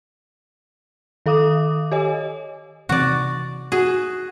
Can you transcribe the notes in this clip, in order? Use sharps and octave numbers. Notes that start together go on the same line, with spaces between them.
D#3 A4 F5 D6 D#6
G4 C#5 D#5 G#5
C3 E3 C4 F#4 D5
F#4 G#4